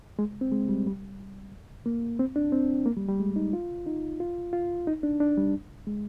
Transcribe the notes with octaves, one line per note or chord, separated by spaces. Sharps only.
G#3
C4
G#3
G3
G3
A#3
C4
D4
C4
A#3
G3
G3
G#3
D#4
F4
D#4
F4
F4
D#4
D4
D4
G3
G#3